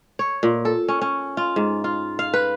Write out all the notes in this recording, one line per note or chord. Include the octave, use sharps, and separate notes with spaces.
C#5
A#2
A4
C#4
C#4
F4
G#2
F4
F5
B4